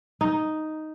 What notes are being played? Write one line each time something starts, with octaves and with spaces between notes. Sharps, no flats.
D#4